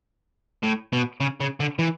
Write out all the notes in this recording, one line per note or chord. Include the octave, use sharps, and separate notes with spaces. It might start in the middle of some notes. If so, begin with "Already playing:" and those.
A2
B2
C#3
C#3
D3
E3